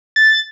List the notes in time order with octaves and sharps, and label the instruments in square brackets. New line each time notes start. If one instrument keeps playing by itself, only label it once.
[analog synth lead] A6